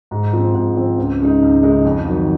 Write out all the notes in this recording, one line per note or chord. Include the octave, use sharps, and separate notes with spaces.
G#2
F3 C4
G#2
F3 C4
C#2
C#3 G#3 D#4
C#2
C#3 G#3 D#4
F2
D#3 F#3